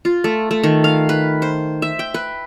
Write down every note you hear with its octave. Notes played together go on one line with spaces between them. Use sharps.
F4
A3
A3
D#3
F5
B4
C5
E5
G5
B4